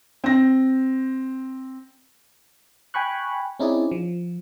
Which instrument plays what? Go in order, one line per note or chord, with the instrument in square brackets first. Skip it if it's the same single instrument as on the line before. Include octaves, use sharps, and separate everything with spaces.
[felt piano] C4 A#6
[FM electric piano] G5 G#5 B5 C#6 F#6
C4 C#4 D#4 E4 G#4 D5
F3